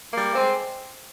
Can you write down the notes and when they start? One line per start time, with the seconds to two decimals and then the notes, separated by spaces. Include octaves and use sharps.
0.13 G3 A#3
0.34 G#3 C4